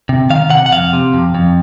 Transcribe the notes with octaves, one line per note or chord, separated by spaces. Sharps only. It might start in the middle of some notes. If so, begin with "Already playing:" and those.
C3
D#3 F5
C3 F#5
F#5
F2 F5
C3
F2
F2